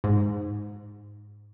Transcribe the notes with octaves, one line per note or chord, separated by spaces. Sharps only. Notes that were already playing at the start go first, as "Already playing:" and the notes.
G#2